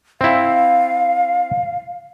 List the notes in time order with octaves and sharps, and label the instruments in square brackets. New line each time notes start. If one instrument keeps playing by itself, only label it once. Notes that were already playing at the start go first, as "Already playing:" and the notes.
[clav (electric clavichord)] C4 E4 [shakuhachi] F5